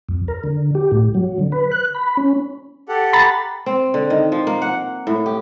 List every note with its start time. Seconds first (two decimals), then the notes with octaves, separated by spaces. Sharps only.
0.09 F2
0.28 A#4
0.44 D3
0.75 G4
0.92 A2
1.14 F#3
1.39 D3
1.52 B4
1.72 F#6
1.94 B5
2.17 C#4
2.89 G4 A4 F#5
3.13 A#5 B5 A6
3.66 C4
3.94 D3
4.10 D#3
4.32 F3
4.47 A#3
4.62 F#5
5.07 A2
5.26 G4